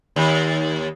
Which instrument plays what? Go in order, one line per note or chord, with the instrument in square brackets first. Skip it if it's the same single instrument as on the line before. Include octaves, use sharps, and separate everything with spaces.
[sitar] D#2